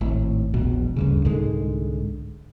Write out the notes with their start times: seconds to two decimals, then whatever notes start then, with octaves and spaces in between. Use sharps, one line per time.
0.01 G#1 A2
0.54 E1 A#1 B2
0.96 D2 G2 C#3
1.25 C2 G#2 D3 G#3